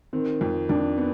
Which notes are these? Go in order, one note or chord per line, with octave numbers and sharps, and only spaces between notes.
D#3 C4
F2
F2 D4
B3